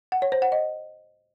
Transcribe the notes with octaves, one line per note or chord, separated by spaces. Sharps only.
F#5
C#5
C5
F#5
D#5